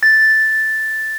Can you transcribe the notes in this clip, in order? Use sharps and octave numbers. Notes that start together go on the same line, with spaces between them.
A6